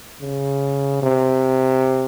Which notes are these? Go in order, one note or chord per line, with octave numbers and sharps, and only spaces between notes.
C#3
C3